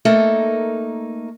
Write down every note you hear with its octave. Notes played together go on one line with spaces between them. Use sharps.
A3 A#3 D#4 A4 A#4